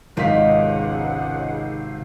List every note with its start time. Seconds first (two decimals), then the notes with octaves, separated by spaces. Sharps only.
0.17 G#1 C#2 C3 D#3 G#3 F5 F#5 B6